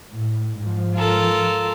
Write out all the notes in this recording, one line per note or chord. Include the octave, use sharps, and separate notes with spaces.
A2
G#2 F3
F4 A4 A#4